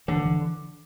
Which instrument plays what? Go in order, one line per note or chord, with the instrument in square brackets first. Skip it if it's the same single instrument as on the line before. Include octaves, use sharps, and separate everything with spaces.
[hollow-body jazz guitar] D3 [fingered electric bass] E3
[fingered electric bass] E3